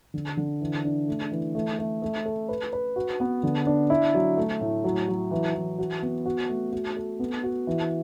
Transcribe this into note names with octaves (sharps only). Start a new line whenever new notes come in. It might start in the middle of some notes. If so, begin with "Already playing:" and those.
D3
D3
E3
D4
A3
E3
A3
A3
A3
A4
B4
B4
F#4
B3
D3
D4
E4
F#3
A3
A2
F#3
F#3
E3
E3
F#4
B3
F#4
A3
F#4
A4
B3
F#4
E3